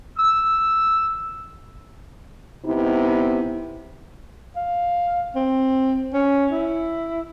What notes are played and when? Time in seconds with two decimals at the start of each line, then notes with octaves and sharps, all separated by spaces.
0.18 E6
2.65 C3 B3 D#4 E4
4.56 F5
5.36 C4
6.14 C#4
6.52 E4